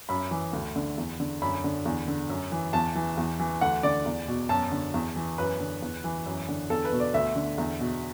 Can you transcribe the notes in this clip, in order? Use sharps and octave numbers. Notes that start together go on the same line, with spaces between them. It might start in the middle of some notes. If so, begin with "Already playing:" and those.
F#2 B5
E3
D2
D3
E2
D3
F#2 B5
D3
E2
D3
F#2
E3
E2 A5
E3
E2
E3
D2 F#5
D3 D5
E2
B2
F#2 A5
D3
E2
E3
F#2 B4
D3
E2
E3
F#2
D3
E2 A4
B4
B2
D5
D2 E5
D3
E2
B2